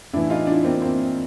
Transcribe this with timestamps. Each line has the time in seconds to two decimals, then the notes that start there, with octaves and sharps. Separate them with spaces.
0.13 A2 E3 D4 E4
0.30 D#4 F4
0.47 D4 E4
0.64 A#3 C4
0.82 A#3 C4